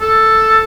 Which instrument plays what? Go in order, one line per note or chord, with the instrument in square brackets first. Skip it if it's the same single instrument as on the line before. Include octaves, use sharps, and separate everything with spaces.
[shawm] A4